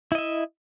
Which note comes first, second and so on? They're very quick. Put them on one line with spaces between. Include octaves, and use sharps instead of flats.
E4 D#5 E5